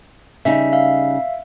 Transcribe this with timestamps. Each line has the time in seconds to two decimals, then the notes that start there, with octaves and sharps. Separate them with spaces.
0.45 C#3 G3 D#4 E5
0.73 E5 F5